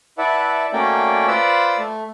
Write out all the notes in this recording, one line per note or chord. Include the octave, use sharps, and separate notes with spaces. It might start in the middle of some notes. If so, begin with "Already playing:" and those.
E4 B4 D5 E5 F#5 A5
A3 A#3 C#4 F#4 D5 G5
F4 B4 C5 D5 B5 E6
A3